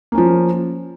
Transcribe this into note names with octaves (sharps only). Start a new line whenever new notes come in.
F3 A#3 C#4